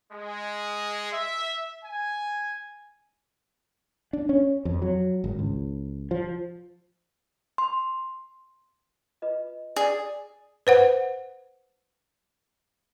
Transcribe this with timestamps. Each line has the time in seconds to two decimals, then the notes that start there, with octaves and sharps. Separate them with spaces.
0.13 G#3
1.13 E5
1.85 G#5
4.13 D4
4.29 C#4
4.65 F2
4.82 F#3
5.24 G#1
5.39 C#2
6.11 F3
7.58 C6
9.22 F4 B4 D#5
9.76 G#4 D5
10.67 B4 C5 F#5